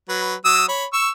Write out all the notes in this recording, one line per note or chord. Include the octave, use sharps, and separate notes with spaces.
F#3 B4
F#3 D#6 E6
C#5 B5
C#6 E6